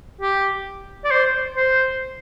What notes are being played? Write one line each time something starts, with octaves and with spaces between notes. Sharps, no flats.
G4
D5
C5
C5